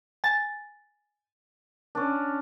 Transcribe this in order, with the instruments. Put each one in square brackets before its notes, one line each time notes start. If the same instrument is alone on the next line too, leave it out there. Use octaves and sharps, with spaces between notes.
[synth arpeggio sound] G#5 A6
[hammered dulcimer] C#4 D4